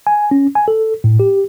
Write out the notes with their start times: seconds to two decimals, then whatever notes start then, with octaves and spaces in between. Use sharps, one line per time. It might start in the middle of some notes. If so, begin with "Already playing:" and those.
0.07 G#5
0.31 C#4
0.55 G#5
0.68 A4
1.04 A2
1.20 G4